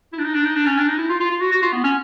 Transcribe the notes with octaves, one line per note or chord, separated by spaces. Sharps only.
E4
D4
D#4
D4
D#4
D4
C#4
D4
D#4
E4
F4
F4
F4
F#4
F#4
F4
B3
C#4